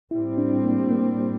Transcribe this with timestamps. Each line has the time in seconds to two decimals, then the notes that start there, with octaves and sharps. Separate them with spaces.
0.11 A2 G3 C4 E4
0.38 D4
0.64 A#3
0.91 A#3